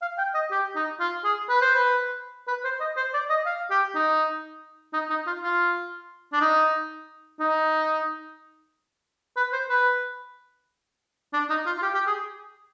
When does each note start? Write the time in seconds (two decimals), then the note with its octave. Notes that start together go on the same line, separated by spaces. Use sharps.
0.02 F5
0.18 G5
0.34 D#5
0.51 G4
0.76 D#4
1.00 F4
1.25 G#4
1.49 B4
1.62 C5
1.75 B4
2.48 B4
2.65 C5
2.81 D#5
2.97 C5
3.14 D5
3.30 D#5
3.46 F5
3.71 G4
3.95 D#4
4.94 D#4
5.10 D#4
5.27 F4
5.43 F4
6.33 D4
6.41 D#4
7.40 D#4
9.37 B4
9.53 C5
9.69 B4
11.33 D4
11.50 D#4
11.66 F4
11.78 F4
11.83 G4
11.95 G4
12.07 G#4